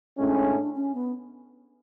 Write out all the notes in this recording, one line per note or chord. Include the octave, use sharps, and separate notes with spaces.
A2 G#3 C#4 D4
C#4
B3